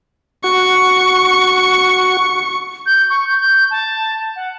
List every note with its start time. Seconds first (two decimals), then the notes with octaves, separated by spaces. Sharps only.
0.44 F#4 C#6
2.86 G6
3.10 C#6
3.27 G6
3.41 G6
3.71 A5
4.36 F#5